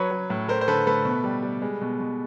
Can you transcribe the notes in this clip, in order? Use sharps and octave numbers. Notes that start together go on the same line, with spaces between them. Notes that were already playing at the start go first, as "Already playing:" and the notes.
Already playing: F#3 B4 C#5
F#3
A2
A3 A#4 C5
C5
D3 A4 B4
A3 A4 B4
B2
G3
G3
G#3
B2
B2